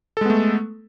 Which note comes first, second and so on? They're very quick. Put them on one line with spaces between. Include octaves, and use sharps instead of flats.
A4 G#3 B3 A3